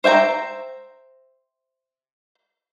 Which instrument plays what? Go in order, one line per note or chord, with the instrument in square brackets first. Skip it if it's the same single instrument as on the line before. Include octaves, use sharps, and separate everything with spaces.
[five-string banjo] C5 E5 G5 A5 A#5